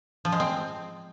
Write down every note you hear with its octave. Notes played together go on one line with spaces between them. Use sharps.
F3
G#3
C4